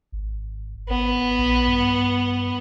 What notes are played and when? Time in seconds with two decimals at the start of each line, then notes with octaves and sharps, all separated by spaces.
0.12 G#1
0.89 G#1 B3
1.38 A#1
1.68 G2